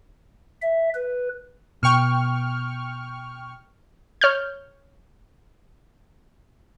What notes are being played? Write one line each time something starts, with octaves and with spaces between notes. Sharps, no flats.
E5
B4
B2 G5 C#6 F6
C#5 F6 G6